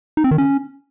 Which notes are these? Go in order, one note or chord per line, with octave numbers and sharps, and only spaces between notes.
D#4
C4
D#3
C#4